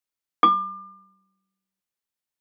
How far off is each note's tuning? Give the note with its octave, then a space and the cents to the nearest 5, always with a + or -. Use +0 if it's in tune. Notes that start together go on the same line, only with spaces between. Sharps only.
D6 +35